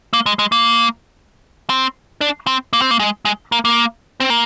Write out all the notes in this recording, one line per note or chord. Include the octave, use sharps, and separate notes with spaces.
A#3
G#3
G#3
A#3
C4
D4
C4
A#3
C4
A#3
G#3
G#3
A#3
A#3
C4
A#3